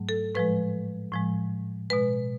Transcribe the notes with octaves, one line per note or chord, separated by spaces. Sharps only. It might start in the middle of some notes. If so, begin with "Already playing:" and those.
Already playing: G#2 F#3 A3
A4
A2 F3 G#3 B4
A2 F3 G#3
B2 G#3 B4